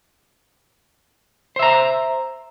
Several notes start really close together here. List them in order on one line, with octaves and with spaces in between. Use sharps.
C5 E5 A#5